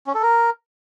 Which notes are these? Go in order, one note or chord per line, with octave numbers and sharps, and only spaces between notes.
C#4
A4
A#4